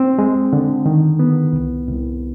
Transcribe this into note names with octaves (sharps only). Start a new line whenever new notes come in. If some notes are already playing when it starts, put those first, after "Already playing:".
Already playing: C4
G#3
D3
D#3
B3
C2
C2